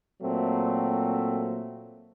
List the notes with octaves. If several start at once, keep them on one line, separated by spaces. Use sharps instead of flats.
A#2 F#3 A3 C4